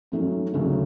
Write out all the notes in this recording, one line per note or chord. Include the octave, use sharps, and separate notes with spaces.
G#2 F#3 A3 C#4
D2 C#3 F#3 A3